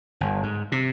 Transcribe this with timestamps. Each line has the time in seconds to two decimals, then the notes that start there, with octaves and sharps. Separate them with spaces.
0.21 G1
0.43 G#2
0.72 C3